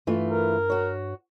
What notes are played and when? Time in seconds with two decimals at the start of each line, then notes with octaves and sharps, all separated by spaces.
0.07 G2 E3 A3 F4
0.28 A#4
0.70 F#4 C#5